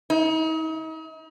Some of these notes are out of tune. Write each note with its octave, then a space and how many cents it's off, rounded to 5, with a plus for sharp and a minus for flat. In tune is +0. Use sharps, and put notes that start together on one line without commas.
D#4 +40